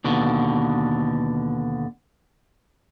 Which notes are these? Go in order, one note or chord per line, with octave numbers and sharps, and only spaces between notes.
D#2 B2 D3